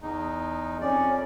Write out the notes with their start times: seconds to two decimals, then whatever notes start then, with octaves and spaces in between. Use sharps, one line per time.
0.02 E2 D#4
0.81 F2 C#4 D5